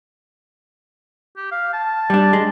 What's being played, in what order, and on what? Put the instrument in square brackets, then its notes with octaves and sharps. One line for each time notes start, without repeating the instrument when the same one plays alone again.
[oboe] G4
F5
A5
[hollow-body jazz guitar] G3 D4
G#3